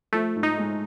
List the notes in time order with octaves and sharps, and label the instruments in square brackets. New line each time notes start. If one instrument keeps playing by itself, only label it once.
[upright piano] F3 [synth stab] A3
[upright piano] G#2
[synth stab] D#4
[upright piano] G#3